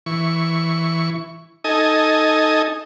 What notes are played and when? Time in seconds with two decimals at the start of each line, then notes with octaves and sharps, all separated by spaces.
0.06 E3 C#6
1.64 D#4 A4 D#5 G#5